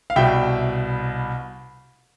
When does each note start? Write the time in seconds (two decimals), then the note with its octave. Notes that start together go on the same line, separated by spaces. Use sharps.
0.10 F5
0.16 C2 B2 E5 G5